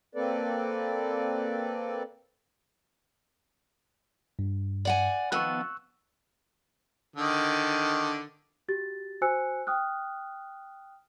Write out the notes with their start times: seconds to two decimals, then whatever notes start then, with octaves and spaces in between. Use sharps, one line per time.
0.15 A#3 C4 A4 B4 D5
4.39 G2
4.85 D5 F#5 G#5
5.32 D#3 F3 B3 C#6 E6 F#6
7.16 D3 D#3
8.68 F#4 G4 A6
9.22 F#4 C5 G#5 E6 F#6 C#7
9.67 G5 D#6 F6 F#6